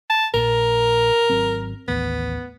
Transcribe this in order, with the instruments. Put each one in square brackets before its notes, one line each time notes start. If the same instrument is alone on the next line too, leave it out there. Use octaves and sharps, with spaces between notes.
[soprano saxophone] A5
[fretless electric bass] A#1 A#2 [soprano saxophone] A#4
[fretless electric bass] G#1 F#3 C4
[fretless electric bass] A1 D#2 [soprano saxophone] B3